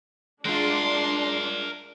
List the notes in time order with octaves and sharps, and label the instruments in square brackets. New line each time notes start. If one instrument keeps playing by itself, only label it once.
[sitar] G#3 F4 [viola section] D4 [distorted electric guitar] A#4 F#5 [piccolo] C6